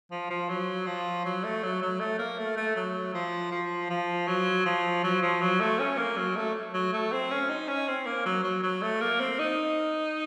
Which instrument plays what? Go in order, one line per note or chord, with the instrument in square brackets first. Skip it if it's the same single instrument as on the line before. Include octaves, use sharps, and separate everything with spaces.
[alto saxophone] F3
F3
F#3
F3
F#3
A3
F#3
F#3
A3
A#3
A3
A3
F#3
F3
F3
F3
F#3
F3
F#3
F3
F#3
A3
C#4
A#3
F#3
A3
F#3
A3
C4
C#4
D#4
C#4
C4
A#3
F#3
F#3
F#3
A3
A#3
C4
D#4